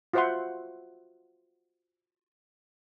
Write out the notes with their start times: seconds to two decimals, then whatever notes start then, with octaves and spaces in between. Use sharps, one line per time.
0.13 F4 F#4 C5 E5 F#5 C6